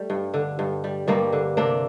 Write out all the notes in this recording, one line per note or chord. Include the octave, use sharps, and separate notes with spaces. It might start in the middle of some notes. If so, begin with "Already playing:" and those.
Already playing: G3 A3
G2
D3
G2
G3
G2 G3 A#3
D3
C3 A#3 D4